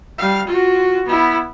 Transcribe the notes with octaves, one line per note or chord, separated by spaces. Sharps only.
G3 F5
F4 F#4
B3 E4